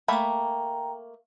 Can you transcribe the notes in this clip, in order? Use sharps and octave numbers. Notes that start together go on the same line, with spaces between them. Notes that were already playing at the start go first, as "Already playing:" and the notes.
A3 A#3 G5 A#5 B5